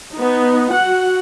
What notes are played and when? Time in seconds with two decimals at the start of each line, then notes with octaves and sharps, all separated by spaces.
0.15 B3 D#4
0.73 F#4 F#5